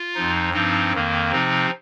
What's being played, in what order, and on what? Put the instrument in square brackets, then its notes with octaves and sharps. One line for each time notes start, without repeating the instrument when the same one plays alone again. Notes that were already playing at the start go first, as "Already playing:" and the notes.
Already playing: [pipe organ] F4
F2 F3 D#4
G2 F3 C4 D#4
F2 D#3 A#3
C3 F3 C4 D#4